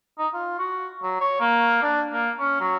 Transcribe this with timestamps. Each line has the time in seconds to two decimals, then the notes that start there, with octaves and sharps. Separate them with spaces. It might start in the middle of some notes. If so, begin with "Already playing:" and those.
0.19 D#4
0.34 F4
0.59 F#4
1.03 F#3
1.21 C#5
1.40 A#3
1.82 D4
2.13 A#3
2.39 C#4
2.60 F#3